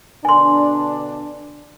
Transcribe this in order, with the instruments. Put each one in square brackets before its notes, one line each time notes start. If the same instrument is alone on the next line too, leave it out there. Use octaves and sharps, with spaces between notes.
[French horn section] B2 D3 D4 [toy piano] G#5 C6